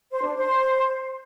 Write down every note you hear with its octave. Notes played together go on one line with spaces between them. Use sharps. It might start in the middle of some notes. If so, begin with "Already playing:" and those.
C5
D4
C5